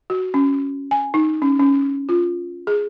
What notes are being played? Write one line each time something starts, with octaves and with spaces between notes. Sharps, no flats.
F#4
C#4
G#5
D#4
C#4
C#4
F4
G#4